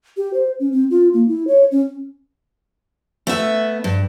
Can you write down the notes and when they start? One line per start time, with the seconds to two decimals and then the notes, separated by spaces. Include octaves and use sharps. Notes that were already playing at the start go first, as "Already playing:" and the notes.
0.17 G4
0.34 C5
0.60 C#4
0.72 C4
0.90 F4
1.14 A#3
1.28 E4
1.47 C#5
1.72 C#4
3.27 A3 B3 E5
3.84 G2